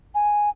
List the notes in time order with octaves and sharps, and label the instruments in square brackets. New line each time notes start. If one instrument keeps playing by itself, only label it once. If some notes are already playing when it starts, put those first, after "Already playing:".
[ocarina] G#5